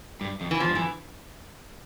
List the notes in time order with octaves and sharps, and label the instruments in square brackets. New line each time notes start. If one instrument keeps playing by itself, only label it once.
[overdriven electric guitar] G2
F2
[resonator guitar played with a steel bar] E3
[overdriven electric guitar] E2 [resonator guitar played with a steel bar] F3
[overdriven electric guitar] G2
[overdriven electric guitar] F2 [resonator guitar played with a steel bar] E3